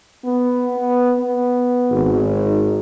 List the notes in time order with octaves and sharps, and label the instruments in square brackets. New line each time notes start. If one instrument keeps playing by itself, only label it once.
[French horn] B3
B3
B3
[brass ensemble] G#1
[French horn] D#4